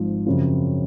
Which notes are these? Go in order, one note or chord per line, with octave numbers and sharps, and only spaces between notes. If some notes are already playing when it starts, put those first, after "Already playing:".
Already playing: G#1 G#2 F3
F#2 C#3 F3 C4 F4